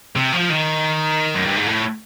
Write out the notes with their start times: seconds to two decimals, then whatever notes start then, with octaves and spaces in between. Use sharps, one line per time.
0.16 C3
0.32 F3
0.49 D#3
1.35 F#2
1.46 G2
1.56 G#2
1.67 A2